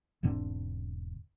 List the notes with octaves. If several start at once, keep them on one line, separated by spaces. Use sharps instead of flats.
E1 G#2 D3 C4